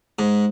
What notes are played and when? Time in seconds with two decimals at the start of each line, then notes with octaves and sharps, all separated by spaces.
0.19 G#2